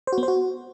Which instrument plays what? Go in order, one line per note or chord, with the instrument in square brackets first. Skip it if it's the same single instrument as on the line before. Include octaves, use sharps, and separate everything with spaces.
[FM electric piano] C5
F#4
B3
C5
F#4